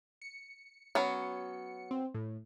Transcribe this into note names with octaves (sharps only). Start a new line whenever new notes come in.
C#7
F#3 B3 C#4
C4
A2